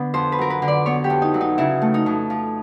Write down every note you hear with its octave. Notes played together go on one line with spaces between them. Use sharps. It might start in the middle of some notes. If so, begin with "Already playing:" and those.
Already playing: D3 B3
F2 C5
B4
F#3 A#4
B4
D3
D5
B3 C#5
G4
F2
D#4
F#3
D#4
C#3 E4
A3
D#4
F2
F3